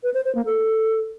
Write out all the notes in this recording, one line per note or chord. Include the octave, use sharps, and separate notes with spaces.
B4
C5
C5
A#3
A4